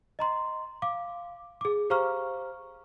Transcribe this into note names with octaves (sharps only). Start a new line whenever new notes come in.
D#5 A#5 C6
F5 D6
G#4 D6
G4 C5 F5 A#5 C#6 F6